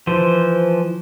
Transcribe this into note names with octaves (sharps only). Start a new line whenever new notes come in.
E3 F3 C5